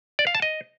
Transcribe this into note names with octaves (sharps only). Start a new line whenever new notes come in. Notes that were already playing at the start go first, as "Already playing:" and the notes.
D5
F5
A5
D#5